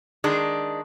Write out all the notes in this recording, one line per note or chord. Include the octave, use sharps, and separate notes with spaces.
D#3 G#3 D4